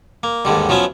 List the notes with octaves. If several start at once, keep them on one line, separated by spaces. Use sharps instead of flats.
A#3
D#2 G#2 D3 G3
F3 F#3 B3 C#4 E5